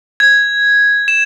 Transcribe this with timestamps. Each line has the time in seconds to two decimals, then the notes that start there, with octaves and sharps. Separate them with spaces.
0.20 G#6
1.08 E7